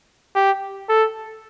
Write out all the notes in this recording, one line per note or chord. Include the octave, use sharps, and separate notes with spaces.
G4
A4